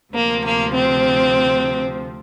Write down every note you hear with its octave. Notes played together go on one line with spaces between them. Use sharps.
D2 C3 F3 A#3
A#3
C4